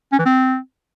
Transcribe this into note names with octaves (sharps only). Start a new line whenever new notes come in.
C#4
E3
C4